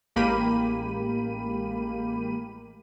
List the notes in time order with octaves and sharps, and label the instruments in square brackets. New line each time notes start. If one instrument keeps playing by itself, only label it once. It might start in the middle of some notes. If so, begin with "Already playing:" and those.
[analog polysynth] A1 G#3 A#3 G4 B5 D#7